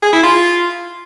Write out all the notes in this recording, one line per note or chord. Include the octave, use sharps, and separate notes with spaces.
G#4
E4
F4